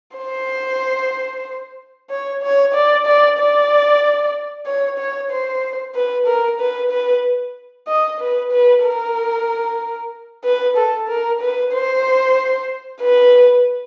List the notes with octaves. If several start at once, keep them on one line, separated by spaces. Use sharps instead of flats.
C5
C#5
C#5
D5
D5
D5
C#5
C#5
C5
B4
A#4
B4
B4
D#5
B4
B4
A#4
B4
A4
A#4
B4
C5
B4